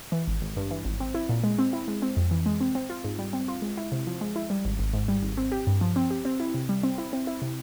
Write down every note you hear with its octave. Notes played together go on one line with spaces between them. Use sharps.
E3
G#1
G#1
G2
E3
G#1
C4
E4
A#2
G#3
C4
E4
G#3
C4
F2
E3
G#3
C4
C4
F4
G#2
G3
C4
F4
G#3
E4
C3
F3
G#3
E4
G3
G#1
G#1
G#2
G3
G#1
C4
G4
G2
F3
C4
G4
C4
E4
C3
G3
C4
E4
C4
E4
C3